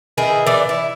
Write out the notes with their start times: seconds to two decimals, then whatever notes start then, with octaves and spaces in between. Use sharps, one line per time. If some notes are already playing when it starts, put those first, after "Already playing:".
0.18 D#3 E3 E4 G#4
0.47 E3 D5
0.69 E4